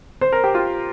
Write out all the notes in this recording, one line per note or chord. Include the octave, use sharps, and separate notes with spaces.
C5
A#4
G4
F4